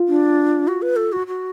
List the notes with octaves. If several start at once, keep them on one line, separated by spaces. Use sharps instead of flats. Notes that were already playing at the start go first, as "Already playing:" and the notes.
Already playing: F4
D4
F#4
B4
A4
F#4
F#4